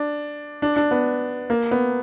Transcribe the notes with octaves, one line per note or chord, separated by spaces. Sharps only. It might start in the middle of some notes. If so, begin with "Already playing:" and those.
Already playing: D4
D4
D4
B3
A#3
B3